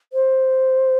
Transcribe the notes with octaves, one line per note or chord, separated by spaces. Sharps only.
C5